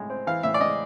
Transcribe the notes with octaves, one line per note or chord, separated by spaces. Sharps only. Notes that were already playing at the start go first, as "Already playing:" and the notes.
Already playing: A2 G#3
C4
E3 F5
A2 E5
D5
G#3 D#5